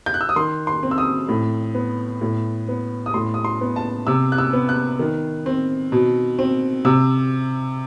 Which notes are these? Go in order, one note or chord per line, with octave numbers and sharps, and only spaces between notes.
G6
F#6
E6
D#6
D#3 C6
C6
C4
E6
D#6
A2
B3
A2
B3
D#6
A2 C6
D#6
C6
B3
A5
C3 E6
F#6
E6
B3
F#6
D#3
C4
B2
C4
C3 E6